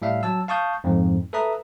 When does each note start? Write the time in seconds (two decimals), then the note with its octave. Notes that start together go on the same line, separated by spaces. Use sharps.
0.02 A2 G3 E5 F5
0.23 F#3 A5 E6
0.48 F5 A5 C#6 D#6 G6
0.84 F2 G#2 F3
1.33 A4 B4 E5 A#5 D#6